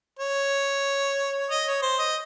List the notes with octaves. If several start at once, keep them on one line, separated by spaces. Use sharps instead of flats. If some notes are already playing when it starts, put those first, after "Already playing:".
C#5
D#5
C#5
C5
D#5